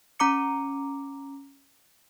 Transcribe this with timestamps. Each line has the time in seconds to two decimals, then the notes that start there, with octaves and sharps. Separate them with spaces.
0.20 C#4 A#5 D6 C#7